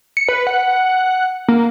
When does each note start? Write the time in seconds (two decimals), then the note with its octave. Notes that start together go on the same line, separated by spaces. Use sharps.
0.17 C#7
0.29 B4
0.47 F#5
1.48 A#3